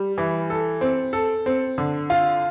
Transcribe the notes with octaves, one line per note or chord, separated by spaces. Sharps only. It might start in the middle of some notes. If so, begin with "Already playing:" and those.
Already playing: G3
E3
A4
C4
A4
C4
D3
F4